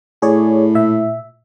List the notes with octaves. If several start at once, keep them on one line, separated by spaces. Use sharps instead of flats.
A2 G#4 C#5 D5
A#2 E5